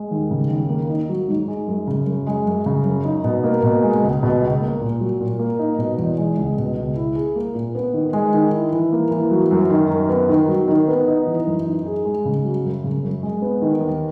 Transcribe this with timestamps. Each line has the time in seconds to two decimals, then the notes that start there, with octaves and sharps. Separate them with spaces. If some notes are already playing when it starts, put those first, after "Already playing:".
Already playing: G#3
0.11 D#2
0.31 C#3
0.50 D#2
0.69 A#3
0.89 D#4
1.09 F#3
1.28 G#2
1.48 G#3
1.67 F#2
1.87 C#3
2.07 F#2
2.27 G#3
2.46 F#2
2.66 C#3
2.85 F#2
3.05 D#4
3.24 B2
3.44 A#3
3.63 B2
3.83 G#3
4.03 C#2
4.23 B2
4.41 C#2
4.62 A#3
4.81 A#2
5.00 F#3
5.21 A#2
5.39 A#3
5.59 D#4
5.78 B2
5.98 E2
6.18 G#3
6.37 C#2
6.58 B2
6.77 C#2
6.96 E4
7.16 G#4
7.36 A#3
7.55 A#2
7.75 B3
7.94 D#3
8.13 G#3
8.34 D#3
8.53 E4
8.73 E3
8.93 A#3
9.11 E3
9.31 F#3
9.51 F#2
9.70 D#3
9.90 F#2
10.09 B3
10.29 D#3
10.48 F#3
10.68 D#3
10.88 B3
11.07 D#4
11.27 E3
11.46 F#2
11.66 D#4
11.86 G#4
12.05 G#3
12.25 C#3
12.45 F#3
12.64 F#2
12.84 C#3
13.03 F#2
13.23 G#3
13.42 B3
13.62 D#3
13.81 D#2